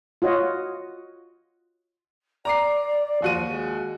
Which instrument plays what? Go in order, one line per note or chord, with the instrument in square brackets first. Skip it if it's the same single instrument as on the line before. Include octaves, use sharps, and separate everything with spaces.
[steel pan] F4 F#4 C#5 D#5
[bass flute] D5 [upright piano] A#5 D6 C7
[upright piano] D#2 F#4 D#7 [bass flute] F3
[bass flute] G#3